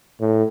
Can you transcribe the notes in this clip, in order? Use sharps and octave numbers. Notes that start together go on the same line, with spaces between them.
A2